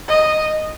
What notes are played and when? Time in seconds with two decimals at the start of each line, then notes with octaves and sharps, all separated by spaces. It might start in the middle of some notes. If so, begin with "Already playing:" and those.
0.08 D#5